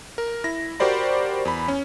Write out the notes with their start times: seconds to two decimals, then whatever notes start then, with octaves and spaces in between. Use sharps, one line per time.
0.18 A#4
0.44 E4 A#6
0.80 F#4 G4 A#4 C5 D5 B5
1.45 E2 B5
1.68 C#4